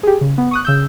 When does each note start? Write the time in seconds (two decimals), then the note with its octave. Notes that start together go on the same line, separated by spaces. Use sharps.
0.03 G4 G#4
0.21 C#3
0.38 B3
0.51 C#6 D#6 F#6
0.65 C#3 E6 G6